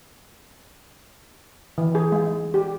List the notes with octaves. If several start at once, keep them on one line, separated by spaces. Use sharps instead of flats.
E3
G#4
G#3
G4